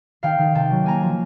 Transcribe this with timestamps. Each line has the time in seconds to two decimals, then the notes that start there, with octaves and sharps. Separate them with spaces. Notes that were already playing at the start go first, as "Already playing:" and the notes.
0.23 D#3 F5 G5
0.38 D#3
0.54 C3 G5 A5
0.71 F#3
0.84 A#3 G#5 A#5
1.02 F3